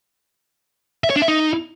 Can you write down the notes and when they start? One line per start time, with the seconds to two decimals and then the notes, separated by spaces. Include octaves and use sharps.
1.04 E5
1.10 C#5
1.16 D4
1.22 E5
1.28 D#4